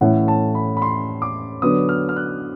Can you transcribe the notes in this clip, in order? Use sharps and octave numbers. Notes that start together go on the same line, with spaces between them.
A2 E3 A3 C#4 F#5
A5
B5
B5
C6
D6
D3 F#3 B3 D#6
F6
F6
F#6